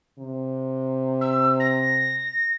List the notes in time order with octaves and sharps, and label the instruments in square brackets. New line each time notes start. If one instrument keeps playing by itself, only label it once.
[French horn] C3
[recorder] E6
A#6